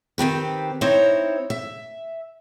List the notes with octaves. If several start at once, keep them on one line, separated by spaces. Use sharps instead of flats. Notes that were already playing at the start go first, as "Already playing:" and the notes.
D#3 C4 G4 B4
C4 D#4 E4 C5 C#5
E5